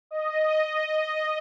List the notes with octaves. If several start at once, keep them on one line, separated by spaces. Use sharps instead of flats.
D#5
D#5